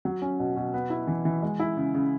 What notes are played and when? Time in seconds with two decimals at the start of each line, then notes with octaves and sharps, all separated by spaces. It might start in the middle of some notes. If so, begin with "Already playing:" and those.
0.05 F#3
0.22 C#4
0.39 B2
0.56 B2
0.74 B3
0.90 E4
1.07 E3
1.25 E3
1.42 G#3
1.59 E4
1.77 C#3
1.94 C#3